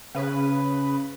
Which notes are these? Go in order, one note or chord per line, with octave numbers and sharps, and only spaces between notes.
C#3 B4